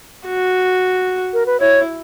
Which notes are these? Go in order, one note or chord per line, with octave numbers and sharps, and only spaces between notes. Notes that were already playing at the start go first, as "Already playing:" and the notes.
F#4
A#4
B4
E4 C#5